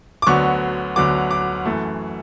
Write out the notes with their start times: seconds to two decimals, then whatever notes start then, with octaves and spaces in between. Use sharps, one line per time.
0.22 D6
0.27 D2 D3 F#3 B3 C#6
0.96 D2 D3 F#3 B3 D6
1.31 D6
1.66 F#2 E3 A3